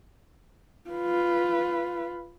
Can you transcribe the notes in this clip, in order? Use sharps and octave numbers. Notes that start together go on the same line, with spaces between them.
F4 B4